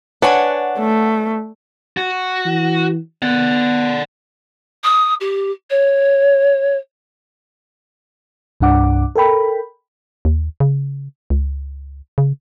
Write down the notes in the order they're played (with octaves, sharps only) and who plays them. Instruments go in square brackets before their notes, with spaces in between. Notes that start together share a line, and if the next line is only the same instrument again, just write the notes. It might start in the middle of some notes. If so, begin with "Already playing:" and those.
[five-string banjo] D4 [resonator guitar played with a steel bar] B4 C#5 G#5 [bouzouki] F#5
[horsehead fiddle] A3
[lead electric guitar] F#4
[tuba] E3
[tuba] B3 [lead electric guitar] D5 F#5
[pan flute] D#6
G4
C#5
[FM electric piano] C2 G2 D4 F#5 D6
A4 A#4 G5 B5
[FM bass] D#2
C#3
C#2
C#3